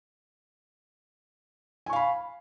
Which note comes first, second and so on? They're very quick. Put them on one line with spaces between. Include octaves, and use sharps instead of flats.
G#5 C#6 F5 B5